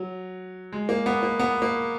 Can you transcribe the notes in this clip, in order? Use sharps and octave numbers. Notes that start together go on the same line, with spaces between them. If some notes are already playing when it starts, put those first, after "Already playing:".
Already playing: F#3
G#3
A#3
B3
A#3
B3
A#3